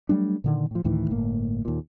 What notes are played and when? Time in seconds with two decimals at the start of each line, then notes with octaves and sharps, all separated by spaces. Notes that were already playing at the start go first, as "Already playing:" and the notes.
0.09 F#3 G3 A3 D4
0.44 A#2 D3 D#3
0.71 A2 F3
0.84 D2 A2 D#3 E3
1.10 G1 A2 A#3
1.65 D#2 A#2